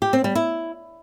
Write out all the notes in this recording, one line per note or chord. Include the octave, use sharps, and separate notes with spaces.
G4
C4
G3
E4